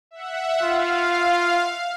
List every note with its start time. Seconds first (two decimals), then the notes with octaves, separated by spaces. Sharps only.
0.11 E5 F#5
0.63 F4 F5